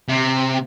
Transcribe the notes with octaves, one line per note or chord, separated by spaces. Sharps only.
C3